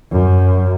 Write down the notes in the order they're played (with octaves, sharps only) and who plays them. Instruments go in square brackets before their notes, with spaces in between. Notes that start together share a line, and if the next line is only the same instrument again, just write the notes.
[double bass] F#2